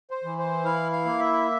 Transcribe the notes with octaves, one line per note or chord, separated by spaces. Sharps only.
C5
E3
C5
E4 F5
F5
A#3
E5